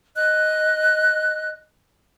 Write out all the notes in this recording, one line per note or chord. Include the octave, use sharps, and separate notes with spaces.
D#5 F#6